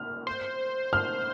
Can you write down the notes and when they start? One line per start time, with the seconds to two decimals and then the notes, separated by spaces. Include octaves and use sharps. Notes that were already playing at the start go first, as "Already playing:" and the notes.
Already playing: F6
0.27 C5
0.93 F6